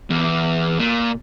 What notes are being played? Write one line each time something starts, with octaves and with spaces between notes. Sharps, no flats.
E2
A#2